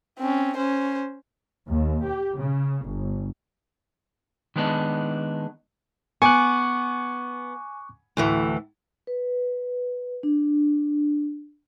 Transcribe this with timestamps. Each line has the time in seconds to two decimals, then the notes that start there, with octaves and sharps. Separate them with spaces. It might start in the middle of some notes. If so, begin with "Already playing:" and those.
0.19 C4 C#4
0.57 C#4 C5
1.69 D#2
2.05 G4
2.39 C#3
2.87 G1
4.56 D#3 G#3 A3 B3 D4 D#4
6.22 B3 G#5 C#6 D6 F#6
8.17 D2 A2 E3
9.07 B4
10.23 D4